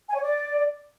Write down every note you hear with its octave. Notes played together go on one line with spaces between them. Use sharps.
G#5
C#5
D5